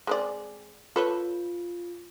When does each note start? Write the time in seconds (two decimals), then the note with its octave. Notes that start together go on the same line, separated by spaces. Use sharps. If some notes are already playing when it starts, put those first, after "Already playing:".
0.07 G#3 C4 D5
0.96 F4 A4 B4 C#5